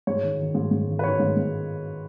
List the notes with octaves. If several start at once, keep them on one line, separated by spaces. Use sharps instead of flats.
G#2 C#5
D#3
D#3
G#2
G#2
D#3
B4
D#3 C#5
G#2
G#2